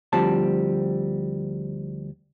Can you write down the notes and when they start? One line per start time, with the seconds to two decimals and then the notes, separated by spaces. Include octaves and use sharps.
0.13 D2 F3 G3 C4 A5